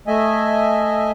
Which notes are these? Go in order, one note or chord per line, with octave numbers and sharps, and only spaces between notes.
A3 D#5 E5 G#5